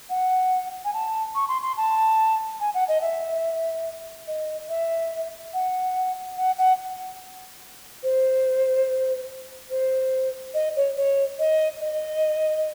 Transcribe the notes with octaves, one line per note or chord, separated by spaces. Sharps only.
F#5
G#5
A5
C#6
C6
C6
A5
G#5
F#5
D#5
E5
D#5
E5
F#5
F#5
F#5
C5
C5
D#5
C#5
C#5
D#5
D#5